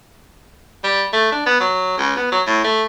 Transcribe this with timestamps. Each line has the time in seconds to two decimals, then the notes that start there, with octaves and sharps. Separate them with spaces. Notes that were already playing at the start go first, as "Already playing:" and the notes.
0.84 G3
1.13 A3
1.32 D4
1.46 B3
1.60 F#3
1.98 C#2
2.17 B3
2.32 F#3
2.47 A2
2.64 A3